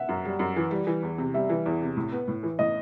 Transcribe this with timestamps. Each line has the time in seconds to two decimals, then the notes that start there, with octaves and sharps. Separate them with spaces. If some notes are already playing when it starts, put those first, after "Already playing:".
Already playing: E5 F#5
0.09 F#2
0.25 G3
0.39 F#2
0.56 E3
0.71 G3
0.87 E3
1.03 E2
1.18 C3
1.34 G3 E5
1.49 E3
1.66 E2
1.81 C3
1.96 A2
2.12 B3
2.28 A2
2.43 E3
2.59 A2 D#5